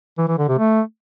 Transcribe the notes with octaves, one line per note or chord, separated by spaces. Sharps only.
E3
E3
D3
C3
A3